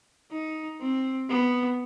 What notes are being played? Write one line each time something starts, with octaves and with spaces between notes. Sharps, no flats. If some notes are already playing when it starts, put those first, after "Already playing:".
D#4
C4
B3